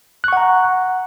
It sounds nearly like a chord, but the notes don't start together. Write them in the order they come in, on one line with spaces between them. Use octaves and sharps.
F#6 C#6 F#5 A#5